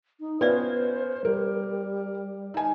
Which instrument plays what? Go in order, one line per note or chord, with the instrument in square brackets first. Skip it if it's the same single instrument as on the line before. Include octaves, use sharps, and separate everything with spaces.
[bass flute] D#4
[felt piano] B3 C#4 F4 [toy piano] B4 D5 E5 [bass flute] C5
[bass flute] G3 [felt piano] A#4
[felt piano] D#4 G#5